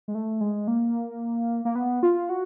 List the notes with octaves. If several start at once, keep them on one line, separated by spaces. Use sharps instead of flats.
G#3
A3
G#3
A#3
A#3
B3
F4
F#4